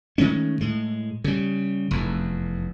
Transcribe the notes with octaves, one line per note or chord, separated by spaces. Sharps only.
D#3 G#3 A3 C#4
A2 G#3
C#3 G3
F1 E2